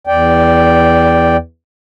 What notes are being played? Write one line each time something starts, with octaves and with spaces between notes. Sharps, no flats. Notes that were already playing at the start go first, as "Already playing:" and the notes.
E2 D5 G5